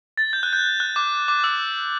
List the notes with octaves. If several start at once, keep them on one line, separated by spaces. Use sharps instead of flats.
A6
G6
F#6
G6
F#6
D6
D6
E6